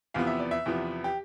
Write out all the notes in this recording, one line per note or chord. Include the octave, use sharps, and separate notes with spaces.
E2 C3 F3 B3 F5
E5
D5
E5
E2 C3 F3 B3
G4